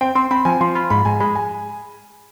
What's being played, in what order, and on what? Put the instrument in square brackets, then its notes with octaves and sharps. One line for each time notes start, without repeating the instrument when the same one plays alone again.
[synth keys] C4 [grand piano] G5
[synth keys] C4 [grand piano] C6
[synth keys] C4 [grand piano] B5
[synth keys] F3 [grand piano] G#5
[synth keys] F3 [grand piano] C6
[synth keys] F4 [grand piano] B5
[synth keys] G#2 [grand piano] B5
[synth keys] G#2 [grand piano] G#5
[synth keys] G#3 [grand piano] B5
[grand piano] G#5